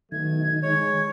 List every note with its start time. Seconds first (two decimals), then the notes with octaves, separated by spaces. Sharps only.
0.12 B2 D#3 F#3 A3 G#6
0.63 G#3 C#5 G#6